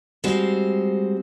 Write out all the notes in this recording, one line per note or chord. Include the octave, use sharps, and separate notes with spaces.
G3 G#3 C4 F#4 C5